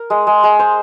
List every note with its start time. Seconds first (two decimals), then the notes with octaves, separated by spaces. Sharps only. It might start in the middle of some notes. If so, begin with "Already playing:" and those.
Already playing: A#4
0.10 G#3
0.27 G#3
0.43 G#3
0.59 C5